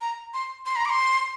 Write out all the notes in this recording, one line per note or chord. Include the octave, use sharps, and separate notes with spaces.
A#5
C6
C6
A#5
D6
C6